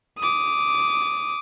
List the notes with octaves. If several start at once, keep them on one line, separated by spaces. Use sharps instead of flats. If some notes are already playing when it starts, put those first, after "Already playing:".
D6 D#6